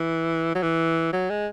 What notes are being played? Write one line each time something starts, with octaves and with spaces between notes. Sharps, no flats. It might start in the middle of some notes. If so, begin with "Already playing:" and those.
Already playing: E3
F#3
E3
F#3
G#3